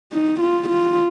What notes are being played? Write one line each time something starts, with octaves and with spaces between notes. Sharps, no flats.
D#4
F4
F4